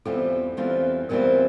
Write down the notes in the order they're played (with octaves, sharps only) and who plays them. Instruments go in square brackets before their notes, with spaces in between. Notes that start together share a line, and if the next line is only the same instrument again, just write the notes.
[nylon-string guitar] E2 E3 G3 C4 F4 [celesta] A4
[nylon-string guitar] E2 E3 G3 C4 F4
[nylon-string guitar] E2 E3 G3 C4 F4 [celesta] A#4